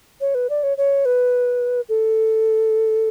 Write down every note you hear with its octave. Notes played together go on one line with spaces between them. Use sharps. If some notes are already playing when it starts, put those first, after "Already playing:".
C#5
B4
D5
C#5
C#5
B4
A4